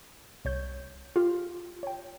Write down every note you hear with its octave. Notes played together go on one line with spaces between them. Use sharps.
C2 C#5 G6
F4 G4
C#5 G5